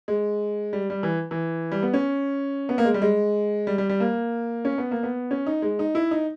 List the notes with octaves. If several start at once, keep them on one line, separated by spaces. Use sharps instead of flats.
G#3
G3
G3
E3
E3
G3
B3
C#4
B3
A#3
G#3
G3
G#3
G3
G3
G3
A#3
C#4
B3
A#3
B3
C#4
D#4
G#3
D#4
E4
D#4